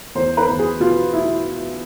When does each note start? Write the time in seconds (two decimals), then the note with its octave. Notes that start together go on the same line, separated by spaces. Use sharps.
0.15 E2 C5
0.37 B4
0.48 E2
0.59 G#4
0.80 B2 F4
1.13 B2 E4